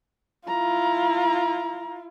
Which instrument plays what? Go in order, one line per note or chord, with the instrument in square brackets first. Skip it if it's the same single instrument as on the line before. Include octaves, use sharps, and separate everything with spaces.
[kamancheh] E4 F4 [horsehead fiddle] A#5